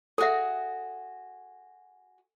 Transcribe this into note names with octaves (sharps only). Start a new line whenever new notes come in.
F#4 G#4 A4 E5